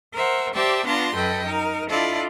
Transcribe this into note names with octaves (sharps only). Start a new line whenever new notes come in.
A#4 C5 E5 F#5
G4 C5 D5 E5 G5 A5
B3 D4 F4 A5 A#5 C6
F#2 A4 B4 D#5 G5
D#4 A#4
D4 E4 F4 A4 D5 D#5